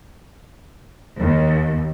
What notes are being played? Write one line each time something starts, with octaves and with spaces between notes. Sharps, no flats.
D#2